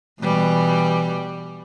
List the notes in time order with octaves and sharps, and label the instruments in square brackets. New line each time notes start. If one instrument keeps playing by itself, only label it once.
[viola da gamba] B2 G3 [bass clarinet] E3